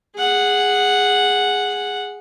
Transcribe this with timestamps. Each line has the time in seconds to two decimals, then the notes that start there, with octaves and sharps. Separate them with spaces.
0.16 G#4 F#5